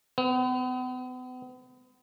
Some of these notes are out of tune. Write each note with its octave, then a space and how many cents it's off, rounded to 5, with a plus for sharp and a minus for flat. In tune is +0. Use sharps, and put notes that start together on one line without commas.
B3 +40